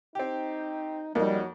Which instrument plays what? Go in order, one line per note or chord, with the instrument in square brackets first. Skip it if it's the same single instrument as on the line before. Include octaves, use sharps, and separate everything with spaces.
[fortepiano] C4 G4 [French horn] D#4
[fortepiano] F2 [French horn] F#3 [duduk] G3 [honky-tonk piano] A#3 D#4